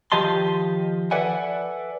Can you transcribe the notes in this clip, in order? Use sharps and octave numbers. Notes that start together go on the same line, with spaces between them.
D#3 F3 G4 D#5 A5 C6
A4 B4 D5 E5 F#5 G#5